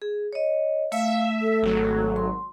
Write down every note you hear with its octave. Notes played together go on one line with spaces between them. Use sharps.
G#4
C#5 D#5
A3 E5 F5
A4
G#1 F#3
C6